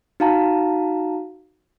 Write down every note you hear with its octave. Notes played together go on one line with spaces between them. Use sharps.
D#4 F#4 F5 A5 A#5